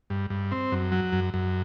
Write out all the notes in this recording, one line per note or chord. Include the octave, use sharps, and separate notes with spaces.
G2
G2
C4
F#2
F#3
F#2
F#2